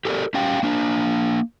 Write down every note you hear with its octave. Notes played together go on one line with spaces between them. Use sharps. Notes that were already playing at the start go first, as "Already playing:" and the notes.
G4 A4 A#4 C#5 D5
C#4 G4 F5 G5
A#3 D4